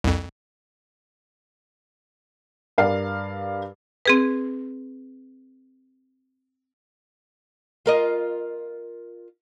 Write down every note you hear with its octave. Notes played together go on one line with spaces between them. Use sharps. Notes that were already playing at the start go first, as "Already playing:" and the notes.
C2 F2
G2 A#4 D5 F5 C7
C4 G#4 B4
F4 A#4 D#5